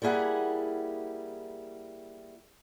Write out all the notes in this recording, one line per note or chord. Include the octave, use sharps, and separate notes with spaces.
G3 A#3 E4 G#4 F#5